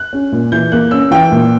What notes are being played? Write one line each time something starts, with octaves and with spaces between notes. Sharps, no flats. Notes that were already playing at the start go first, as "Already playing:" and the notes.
Already playing: F#6
C#4
A#2
E3 G6
A#3 F#6
C#4 E6
E3 G5
A#2